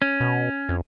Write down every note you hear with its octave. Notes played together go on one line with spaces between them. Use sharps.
C#4
B2
F2